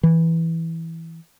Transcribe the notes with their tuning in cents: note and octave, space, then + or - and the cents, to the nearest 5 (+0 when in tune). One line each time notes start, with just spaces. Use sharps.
E3 -5